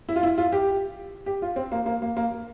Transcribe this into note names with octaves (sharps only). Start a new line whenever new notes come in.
E4
F4
E4
F4
G4
G4
F4
C4
A#3
A#3
A#3
A#3